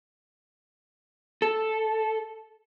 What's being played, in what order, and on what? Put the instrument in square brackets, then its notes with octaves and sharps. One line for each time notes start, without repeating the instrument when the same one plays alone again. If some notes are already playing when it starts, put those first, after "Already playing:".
[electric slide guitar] A4